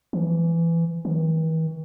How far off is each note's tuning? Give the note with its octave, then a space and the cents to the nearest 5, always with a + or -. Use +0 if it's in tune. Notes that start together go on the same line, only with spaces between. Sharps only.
E3 +20
E3 -45